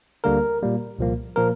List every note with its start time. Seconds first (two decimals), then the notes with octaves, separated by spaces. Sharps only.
0.24 D2 D3 G3 A#3 A#4
0.62 A#2 G3 A#3
0.99 C2 A#2 F3 A#3
1.36 A#2 F3 A#3 A#4